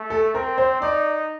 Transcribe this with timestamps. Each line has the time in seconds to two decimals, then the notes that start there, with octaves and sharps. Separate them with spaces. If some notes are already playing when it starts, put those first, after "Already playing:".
Already playing: A3
0.10 A4
0.34 C4 A#4
0.58 C5
0.81 D#4 D5